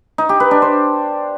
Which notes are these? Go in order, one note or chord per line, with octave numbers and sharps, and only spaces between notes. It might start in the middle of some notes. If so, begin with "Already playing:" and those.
D#4
G4
B4
D4
C5